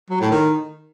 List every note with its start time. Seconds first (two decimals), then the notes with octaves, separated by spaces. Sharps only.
0.10 F#3
0.20 A2
0.31 D#3